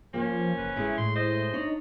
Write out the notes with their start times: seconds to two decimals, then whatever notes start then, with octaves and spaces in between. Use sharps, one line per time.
0.14 F3 A#3 C#4 C5
0.57 F#1 B4
0.76 G1 G#3 A3 E4
0.98 A2 C6
1.16 C5 D#5
1.53 D4 D#4 C#5